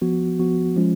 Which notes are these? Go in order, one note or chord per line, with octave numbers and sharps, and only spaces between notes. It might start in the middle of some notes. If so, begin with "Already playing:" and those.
F3 B3 F#4
F3 B3 F#4
F3 G#3 C#4 F4